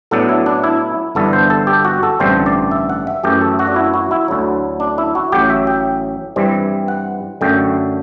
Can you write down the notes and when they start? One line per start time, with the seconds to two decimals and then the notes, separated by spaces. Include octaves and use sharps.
0.11 A2 F#3 B3 D4 A4
0.29 E4
0.46 D4
0.64 E4
1.15 G1 G2 E3 B3 D4 A4
1.33 C5
1.50 A4
1.67 G4
1.85 F#4
2.03 A4
2.20 A1 G2 D3 A3 C4 C5
2.46 D5
2.71 E5
2.89 F#5
3.07 E5
3.23 F#2 E3 A3 G4
3.41 A4
3.59 F#4
3.67 D4
3.76 E4
3.94 F#4
4.11 E4
4.28 D2 D3 F#3
4.80 D4
4.98 E4
5.15 F#4
5.32 A1 A2 F#3 G4
5.50 E5
5.67 G5
6.36 G2 E3 G3 C4
6.88 F#5
7.41 F#2 D3 A3 G5